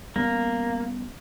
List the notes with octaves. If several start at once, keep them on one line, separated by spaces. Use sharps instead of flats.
G3 A#3 B3 C#4